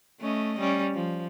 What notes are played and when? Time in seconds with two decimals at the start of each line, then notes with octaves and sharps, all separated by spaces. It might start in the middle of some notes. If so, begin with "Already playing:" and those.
0.20 A3 C#4 D#5
0.59 G3 C#4
0.94 F3